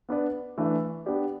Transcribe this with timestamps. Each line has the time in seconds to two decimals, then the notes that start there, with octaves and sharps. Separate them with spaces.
0.09 B3 D4 B4 D5
0.58 E3 A3 D4 B4 E5
1.06 B3 D4 G4 D5